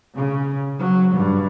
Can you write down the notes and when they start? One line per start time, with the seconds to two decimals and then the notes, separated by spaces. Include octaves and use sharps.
0.17 C#3
0.78 F#3
1.15 G2